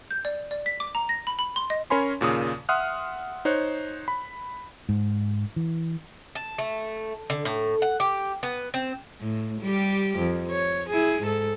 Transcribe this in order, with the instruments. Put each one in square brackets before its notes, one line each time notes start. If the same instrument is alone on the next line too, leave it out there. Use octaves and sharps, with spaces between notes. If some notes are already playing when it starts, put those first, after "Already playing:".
[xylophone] G6
D5
D5
B6
D6
A#5
A#6
B5
B5
C6
D#5
[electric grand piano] C#4 A#4 C#5 G#5 B5 C6
D#2 A#2 C#3 D#6
E5 F#5 C6 D#6 F6 F#6
D#4 C5 C#5 F#6
B5
[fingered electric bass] G#2
E3
[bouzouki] A5
A3
D3
A2
F#5
G4
B3
C4
[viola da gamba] A2
G3 G4
F2
C#5
E4 G#4
G#2 A4